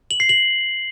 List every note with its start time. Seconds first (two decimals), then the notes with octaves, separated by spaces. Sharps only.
0.11 F#7
0.20 C7
0.29 F#7